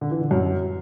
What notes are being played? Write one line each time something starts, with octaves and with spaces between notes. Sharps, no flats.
D3
E3
D3
F#2